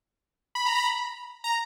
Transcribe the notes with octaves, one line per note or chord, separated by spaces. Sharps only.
B5
A#5
B5
A#5